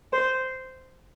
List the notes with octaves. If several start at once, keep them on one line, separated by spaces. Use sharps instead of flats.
C5